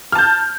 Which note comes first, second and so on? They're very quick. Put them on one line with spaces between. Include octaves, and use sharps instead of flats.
F6 A5 G6